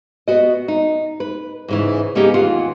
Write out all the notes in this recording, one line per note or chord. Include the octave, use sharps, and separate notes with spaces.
B3 F#4 D#5
D#4
B4
G#2 C#3 E3
A#3 B3 C#4 D#4 G4 G#4
D#2 E3 F4 F#5